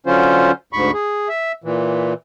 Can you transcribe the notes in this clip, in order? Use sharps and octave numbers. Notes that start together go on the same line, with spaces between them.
D3 F#3 C#4 F4 C5
D2 G#2 B5 C#6
G#4
E5
A#2 E3